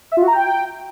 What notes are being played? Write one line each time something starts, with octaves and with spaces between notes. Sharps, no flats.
E5
F4
F#4
A#5
G5